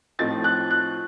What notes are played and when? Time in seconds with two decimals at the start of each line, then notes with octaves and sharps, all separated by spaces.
0.19 A2 F3 C4 D#4 A6
0.44 F#6
0.70 F#6